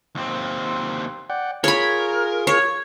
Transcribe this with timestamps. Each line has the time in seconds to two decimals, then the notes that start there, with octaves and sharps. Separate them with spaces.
0.15 D#2 C4
1.30 D5 F#5 G5
1.64 F4 G#4 A#4 C#5 B5
2.47 C#5